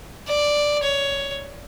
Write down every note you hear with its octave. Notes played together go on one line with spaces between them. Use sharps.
D5
C#5